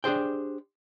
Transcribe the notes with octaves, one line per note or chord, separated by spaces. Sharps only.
D4 G4 G#4 C5 G5